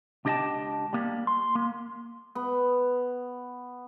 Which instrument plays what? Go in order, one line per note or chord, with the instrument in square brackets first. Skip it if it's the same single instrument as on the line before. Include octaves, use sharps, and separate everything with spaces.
[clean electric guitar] C#2 D4 G4 D#5 G5 A5
G3 A#3
C6
A#3
[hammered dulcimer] B3